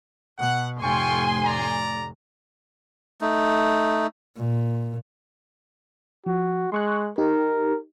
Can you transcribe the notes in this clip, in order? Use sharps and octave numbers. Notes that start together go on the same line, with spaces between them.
B2 F#5
F1 A2 F4 G5 G#5 C6 C#6
D5 A#5
A3 D#4
A#2
F3 F#4
G#3 C6 C#6 F#6
D#4 G4 A#4